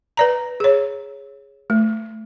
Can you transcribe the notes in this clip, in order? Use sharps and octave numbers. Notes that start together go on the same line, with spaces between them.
B4 D5 A#5
G#4 C#5
A3